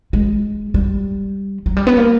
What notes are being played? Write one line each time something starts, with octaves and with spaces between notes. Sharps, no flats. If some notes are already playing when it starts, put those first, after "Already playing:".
G#3
G3
F#3
G3
B3
A#3